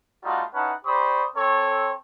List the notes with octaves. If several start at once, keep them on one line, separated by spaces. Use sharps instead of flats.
G3 A3 D#4 F4 F#4
C#4 D#4 E4 B4 F#5 A5
G4 C5 D5 B5 C#6 D#6
C4 A4 C#5